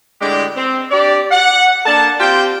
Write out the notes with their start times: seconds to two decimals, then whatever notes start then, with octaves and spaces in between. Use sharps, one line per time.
0.21 A2 D3 G#3 D4 G4
0.56 C4
0.91 D4 G4 D5
1.31 F#5
1.86 A#3 D4 A5
2.20 C4 F4 G4 F5 G5